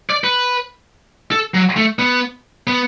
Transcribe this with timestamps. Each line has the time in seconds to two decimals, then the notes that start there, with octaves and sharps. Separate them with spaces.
0.10 D5
0.24 B4
1.31 A4
1.54 F#3
1.77 A3
1.99 B3
2.67 B3